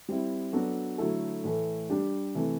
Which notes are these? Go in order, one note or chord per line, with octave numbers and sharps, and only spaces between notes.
G3 C4 E4
F#3 B3 D4 F#4 A4
D3 F#3 A3 E4 A4
A2 E3 A3
G3 D4 G4
C3 E3 A3